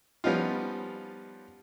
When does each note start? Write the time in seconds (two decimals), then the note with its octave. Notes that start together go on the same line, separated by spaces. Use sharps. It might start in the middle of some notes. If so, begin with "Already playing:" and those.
0.24 F3 G3 B3 C#4 D#4 F4